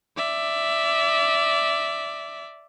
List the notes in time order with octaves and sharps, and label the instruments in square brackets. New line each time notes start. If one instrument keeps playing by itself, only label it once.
[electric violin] D5 E5